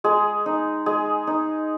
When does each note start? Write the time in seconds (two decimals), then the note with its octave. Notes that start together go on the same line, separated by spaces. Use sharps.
0.04 G#3 G#4
0.46 D#4
0.86 G#3 G#4
1.27 D#4